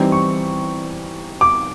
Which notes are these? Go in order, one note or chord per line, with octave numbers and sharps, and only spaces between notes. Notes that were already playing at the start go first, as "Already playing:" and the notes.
Already playing: E3 G3 C4 D#4
C#6
D6